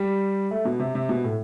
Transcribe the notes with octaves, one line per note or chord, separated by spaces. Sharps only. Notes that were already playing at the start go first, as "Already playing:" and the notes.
Already playing: G3
A3
B2
C3
C3
B2
A2